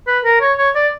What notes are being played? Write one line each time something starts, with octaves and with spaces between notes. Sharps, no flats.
B4
A#4
C#5
C#5
D5